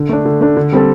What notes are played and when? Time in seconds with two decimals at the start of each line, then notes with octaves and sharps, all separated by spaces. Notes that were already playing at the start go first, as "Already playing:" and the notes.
Already playing: D3
0.09 A3 D4
0.25 D3
0.41 A3 D4
0.57 D3
0.72 G3 C4 A4